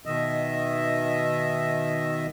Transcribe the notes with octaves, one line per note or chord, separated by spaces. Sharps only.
B2 D#3 D#5 E5